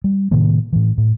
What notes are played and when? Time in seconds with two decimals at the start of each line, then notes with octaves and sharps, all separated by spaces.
0.04 G3
0.31 A2 C3 D#3 A#3
0.73 A2 E3
0.98 A2